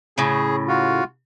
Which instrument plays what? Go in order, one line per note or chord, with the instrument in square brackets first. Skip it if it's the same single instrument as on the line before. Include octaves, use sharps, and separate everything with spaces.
[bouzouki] A2 C#3 [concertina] G#4
[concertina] F4 F#4